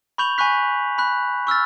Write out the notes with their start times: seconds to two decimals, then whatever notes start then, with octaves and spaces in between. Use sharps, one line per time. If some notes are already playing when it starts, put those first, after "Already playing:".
0.18 B5 C#6 G6 F7 F#7
0.38 G#5 B5 C#6 F#6 B6
0.98 B5 F#6
1.47 C#6 E6 F6 A6